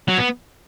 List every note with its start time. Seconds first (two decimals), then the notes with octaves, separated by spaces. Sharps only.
0.09 F#3
0.19 B3